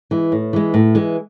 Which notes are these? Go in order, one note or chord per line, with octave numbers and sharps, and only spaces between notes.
E3 G#3
A2
E3 G#3
A2
E3 G#3